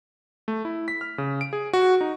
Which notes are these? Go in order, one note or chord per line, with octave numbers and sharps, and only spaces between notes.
A3
E4
B6
F6
C#3
D7
G#4
F#4
D#4